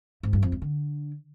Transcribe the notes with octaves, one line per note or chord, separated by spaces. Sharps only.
G#2
G2
F2
G2
D3